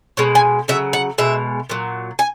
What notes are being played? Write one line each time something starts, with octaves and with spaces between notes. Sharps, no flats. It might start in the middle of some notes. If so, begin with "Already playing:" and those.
B2 G#3 C#5
G#5
C#3 F#3 E5
F#5
B2 G#3 E5
A#2 F#3
G#5